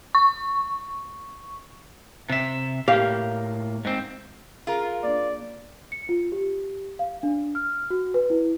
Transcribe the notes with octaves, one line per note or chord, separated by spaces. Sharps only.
C#6
C3 E5
A2 A#3 G4 F5
G#2 C4
F4 G#4 A#4
A#3 D4 D5
C#7
F4
G4
F5
D4
F6
F#4
B4
E4